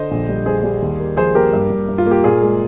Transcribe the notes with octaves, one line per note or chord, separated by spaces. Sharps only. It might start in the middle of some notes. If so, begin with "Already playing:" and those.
Already playing: D3 C5 D#5
A#1
G3
G3 G#4 C5
G3
D#2
A#3
F3 G#4 C5
A#3 G4 A#4
G2
G2
G2
F4
A#3 G4
A#2 F4 G#4
G#3